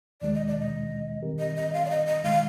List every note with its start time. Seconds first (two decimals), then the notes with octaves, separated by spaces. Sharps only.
0.21 D#2 D#3 G#3 D5
0.34 D#5
0.47 D5
0.59 D#5
1.22 D#3 G3 C4 G4 A#4
1.39 D#5
1.56 D#5
1.73 F5
1.86 D5
1.90 D#5
2.07 D#5
2.23 G#2 D#3 G#3 F5